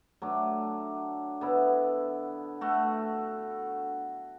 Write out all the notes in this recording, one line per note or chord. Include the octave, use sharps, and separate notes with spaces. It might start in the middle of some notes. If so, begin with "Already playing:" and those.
F#3 A3 D4
D3 B3 E4
A3 F#4 A4